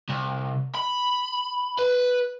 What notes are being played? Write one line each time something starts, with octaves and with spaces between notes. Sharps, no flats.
C2
B5
B4